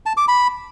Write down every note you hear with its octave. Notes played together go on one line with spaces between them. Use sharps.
A5
D6
B5